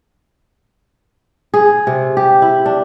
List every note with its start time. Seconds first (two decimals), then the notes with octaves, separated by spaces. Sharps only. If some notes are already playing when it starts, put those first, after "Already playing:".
1.54 G#4
1.87 C3
2.17 G4
2.42 E4
2.66 D4